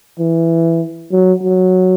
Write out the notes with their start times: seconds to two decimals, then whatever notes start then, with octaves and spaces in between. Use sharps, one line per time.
0.19 E3
1.12 F#3
1.43 F#3